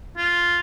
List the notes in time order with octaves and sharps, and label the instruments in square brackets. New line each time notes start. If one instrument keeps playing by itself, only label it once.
[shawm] F4